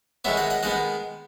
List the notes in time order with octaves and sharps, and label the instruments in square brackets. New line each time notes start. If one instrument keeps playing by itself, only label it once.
[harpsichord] D#3 G#3 B3 C#5 E5
D#5 F#5
D#5 F#5
D#3 G#3 B3 D#5 F#5